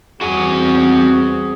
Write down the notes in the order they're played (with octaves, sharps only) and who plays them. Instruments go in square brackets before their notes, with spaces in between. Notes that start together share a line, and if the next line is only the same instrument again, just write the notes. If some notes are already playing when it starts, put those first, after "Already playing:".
[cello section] E2 G3 C4 [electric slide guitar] F#4 F#5 G#5 [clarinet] G#4